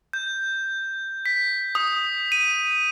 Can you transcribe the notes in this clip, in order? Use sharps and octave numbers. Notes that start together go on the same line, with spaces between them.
G6
B6
D#6
D#7